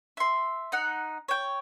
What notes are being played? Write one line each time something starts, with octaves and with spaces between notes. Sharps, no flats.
E5 C6
D#4 F#5
C#5 G5